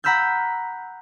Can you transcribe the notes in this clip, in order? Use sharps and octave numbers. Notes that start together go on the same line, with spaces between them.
F#5 A#5 B5 E6 F6 G6